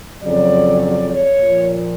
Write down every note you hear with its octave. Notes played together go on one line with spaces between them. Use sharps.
F2 C#3 F#3 D5
D5
C#5
A#2 F3